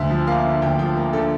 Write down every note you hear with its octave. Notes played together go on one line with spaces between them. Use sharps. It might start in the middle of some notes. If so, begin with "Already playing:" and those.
Already playing: D2 E5
F3
A#3 F5
D3
D2 G5
F3 G5
A#3
D3 A4